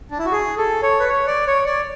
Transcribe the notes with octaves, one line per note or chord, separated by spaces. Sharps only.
D4
E4
F#4
G#4
A4
C#5
B4
C#5
D5
C#5
D5